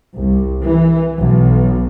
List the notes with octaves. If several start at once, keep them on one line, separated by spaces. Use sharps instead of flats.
C2
E3
B1